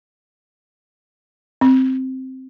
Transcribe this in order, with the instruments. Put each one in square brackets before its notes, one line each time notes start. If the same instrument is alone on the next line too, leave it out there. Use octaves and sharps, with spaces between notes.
[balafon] C4